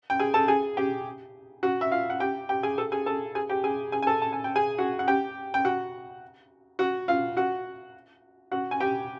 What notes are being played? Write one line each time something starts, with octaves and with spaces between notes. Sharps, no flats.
G5
G#4 G#5
A4 A5
G#4 G#5
G4 G5
F#4 F#5
E5
F4 F5
F#5
G4 G5
G4 G5
G#4 G#5
A4 A5
G#4 G#5
A4 A5
G#4 G#5
G4 G5
G#4 G#5
G#4 G#5
G#5
A4 A5
A5
G#5
G5
G#4 G#5
F#4 F#5
F#5
G4 G5
G5
F#4 F#5
F#4 F#5
F4 F5
F#4 F#5
F#4 F#5
G#5
G4 G5